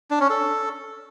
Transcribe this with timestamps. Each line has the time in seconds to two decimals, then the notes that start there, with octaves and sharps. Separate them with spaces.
0.11 D4
0.20 C#4
0.30 A4